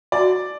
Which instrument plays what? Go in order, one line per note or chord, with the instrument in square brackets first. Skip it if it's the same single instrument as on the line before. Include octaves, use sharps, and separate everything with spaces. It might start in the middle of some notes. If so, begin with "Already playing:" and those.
[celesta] F#4 [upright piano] D5